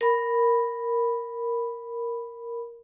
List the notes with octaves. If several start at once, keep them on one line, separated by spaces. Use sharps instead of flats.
A#4 B5